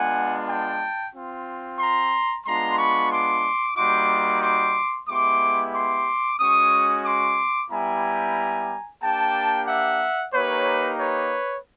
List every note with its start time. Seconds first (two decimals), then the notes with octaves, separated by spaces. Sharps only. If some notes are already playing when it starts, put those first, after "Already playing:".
Already playing: G#3 B3 D4 F4 F#5 G#5
0.48 G5 A5
1.14 C4 F4
1.79 A#5 C6
2.45 G#3 B3 D4 F4 A#5 C6
2.78 B5 C#6
3.11 C6 D6
3.76 G3 A#3 D#4 F#4 C6 D6
4.42 C6 D6
5.08 G#3 B3 E4 G4 C6 D6
5.74 C6 D6
6.39 G#3 C#4 F#4 C#6 D#6
7.05 C6 D6
7.70 G3 B3 E4 G4 G#5 A#5
9.01 A#3 D4 G4 G5 A5
9.67 E5 F#5
10.33 A#3 D#4 G4 B4 C#5
10.99 B4 C#5